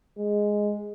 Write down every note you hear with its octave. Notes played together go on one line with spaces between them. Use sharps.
G#3